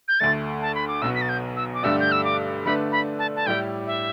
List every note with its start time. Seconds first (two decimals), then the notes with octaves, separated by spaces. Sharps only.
0.08 G6
0.20 D2 D3 A3 A6
0.62 A5
0.75 B5
0.88 D6
1.02 B1 B2 B3 E6
1.15 B6
1.22 A6
1.29 G6
1.57 E6
1.74 D6
1.83 G2 D3 A3 G4 D5 E6
2.00 G6
2.12 E6
2.24 D6
2.65 D3 A3 D4 B4 D5 B5
2.92 B5
3.19 A5
3.36 A5
3.46 A2 G3 E4 G4 D5 G5
3.87 E5